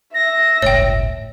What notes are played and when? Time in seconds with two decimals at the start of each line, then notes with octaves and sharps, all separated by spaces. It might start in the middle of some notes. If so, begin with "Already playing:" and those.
0.14 E5 A#6
0.62 G1 C#2 A2 C#5 G5